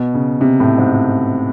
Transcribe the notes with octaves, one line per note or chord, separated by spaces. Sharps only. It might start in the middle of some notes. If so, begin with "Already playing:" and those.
Already playing: B2
C#3
C3
A2
G#2